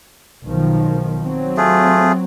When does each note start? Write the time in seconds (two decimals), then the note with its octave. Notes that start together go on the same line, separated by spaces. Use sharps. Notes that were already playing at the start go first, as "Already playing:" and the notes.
0.44 B1 D#3 F3
1.24 F#3 C4
1.57 A3 F4 G#4